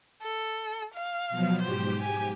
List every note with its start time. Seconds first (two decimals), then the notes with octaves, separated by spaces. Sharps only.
0.22 A4
0.94 F5
1.29 B2 F3 F#3
1.61 G#2 G4 C5
2.02 G#5